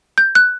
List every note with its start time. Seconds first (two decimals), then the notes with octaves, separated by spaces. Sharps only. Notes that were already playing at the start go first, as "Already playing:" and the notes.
0.18 G6
0.35 F#6